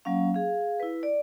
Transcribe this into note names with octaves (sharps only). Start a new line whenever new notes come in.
F#3 A#3 C#4 F5
G#4 F5
E4 B4
D5